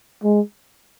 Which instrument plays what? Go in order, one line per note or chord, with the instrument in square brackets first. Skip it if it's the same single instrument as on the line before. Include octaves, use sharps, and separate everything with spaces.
[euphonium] G#3